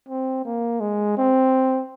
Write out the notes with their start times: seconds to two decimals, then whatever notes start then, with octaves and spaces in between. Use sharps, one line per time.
0.09 C4
0.45 A#3
0.80 G#3
1.17 C4